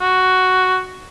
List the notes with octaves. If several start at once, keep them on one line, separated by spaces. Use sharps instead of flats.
F#4